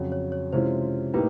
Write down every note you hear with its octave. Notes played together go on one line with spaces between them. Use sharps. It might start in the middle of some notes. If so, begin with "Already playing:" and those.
Already playing: F2 C#3 F#3 C#5
C#5
C#5
C3 E3 G#3 C#4 F4 C5
A2 A#3 D#4 G4 B4